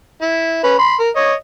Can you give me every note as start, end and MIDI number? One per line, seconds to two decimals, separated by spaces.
0.22 0.63 64
0.64 0.76 61
0.64 0.76 71
0.64 0.76 83
0.79 0.95 83
0.79 0.95 84
0.99 1.10 70
1.16 1.34 73
1.16 1.34 75